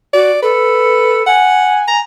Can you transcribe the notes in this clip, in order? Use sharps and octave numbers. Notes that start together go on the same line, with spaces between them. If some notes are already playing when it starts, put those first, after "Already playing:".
F#4 D5
A4 B4
F#5 G#5
A#5